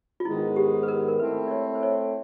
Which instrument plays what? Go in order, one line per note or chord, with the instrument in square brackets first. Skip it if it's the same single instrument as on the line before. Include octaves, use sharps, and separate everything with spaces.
[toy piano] F4
[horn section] G#2 D#3 G#3 B3 [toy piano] E4
[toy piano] G4
B4
A#4
A#4
[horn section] A3 C4 E4 [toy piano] B4
[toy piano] D5
C#5
C5
C#5